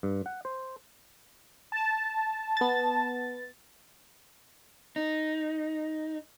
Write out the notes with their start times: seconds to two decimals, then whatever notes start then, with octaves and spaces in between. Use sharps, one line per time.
0.03 G2
0.26 F#5
0.45 C5
1.72 A5
2.57 B3 A6
4.96 D#4